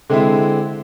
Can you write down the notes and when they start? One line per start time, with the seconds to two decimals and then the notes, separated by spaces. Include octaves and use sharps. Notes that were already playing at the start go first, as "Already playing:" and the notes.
0.09 D3 G#3 C4 E4